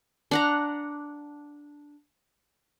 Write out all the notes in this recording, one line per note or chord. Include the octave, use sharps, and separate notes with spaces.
D4 F#5 A#5